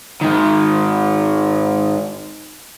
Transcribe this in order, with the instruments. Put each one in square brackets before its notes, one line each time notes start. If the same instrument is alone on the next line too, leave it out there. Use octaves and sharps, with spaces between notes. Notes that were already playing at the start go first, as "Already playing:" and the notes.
[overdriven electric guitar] G#2 D#3